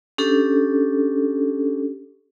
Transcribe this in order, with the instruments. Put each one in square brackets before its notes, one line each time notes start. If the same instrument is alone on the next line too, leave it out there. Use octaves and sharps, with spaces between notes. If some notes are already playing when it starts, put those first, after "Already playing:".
[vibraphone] C#4 D4 G4 A4